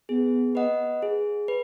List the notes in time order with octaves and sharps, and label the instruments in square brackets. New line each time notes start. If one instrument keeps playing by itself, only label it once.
[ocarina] B3 [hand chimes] G#4
[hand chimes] B4 D#5 F#5
G#4
B4